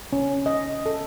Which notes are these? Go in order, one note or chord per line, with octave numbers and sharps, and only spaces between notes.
C#4
D#5
A4